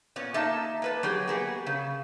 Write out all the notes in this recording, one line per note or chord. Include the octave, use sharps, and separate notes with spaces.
A#2 B3 C#4
A#3 D#4 E5 A5
A#3 B4 A5
F#3 G4 G#4
A#3 B3 G#4
C#3